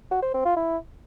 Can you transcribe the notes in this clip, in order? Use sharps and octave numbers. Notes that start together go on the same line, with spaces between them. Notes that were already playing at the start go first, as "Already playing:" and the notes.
F#4
C5
C4
F4
E4